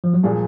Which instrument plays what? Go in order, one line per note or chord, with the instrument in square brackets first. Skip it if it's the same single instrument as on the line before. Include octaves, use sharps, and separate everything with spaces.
[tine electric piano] F3
F#3
[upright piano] A#2 F3 G#3 [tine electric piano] G3